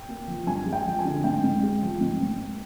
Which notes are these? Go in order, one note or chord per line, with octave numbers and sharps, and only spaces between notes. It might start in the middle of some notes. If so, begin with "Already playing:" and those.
Already playing: G5
A#3
F3
G2 G#5
G#3
G5
F3
G#5
D3
G#2 G5
G#2
G#3
F3
G#2
G#2
A#3